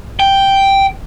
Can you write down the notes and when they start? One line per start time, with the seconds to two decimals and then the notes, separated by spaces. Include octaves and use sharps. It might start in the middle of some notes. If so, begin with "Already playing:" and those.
0.20 G5